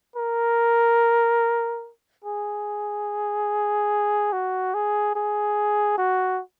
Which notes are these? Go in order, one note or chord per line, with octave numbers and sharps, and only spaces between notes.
A#4
G#4
F#4
G#4
G#4
F#4